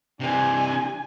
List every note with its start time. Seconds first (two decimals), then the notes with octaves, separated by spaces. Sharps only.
0.20 C3 E3 D4 G#5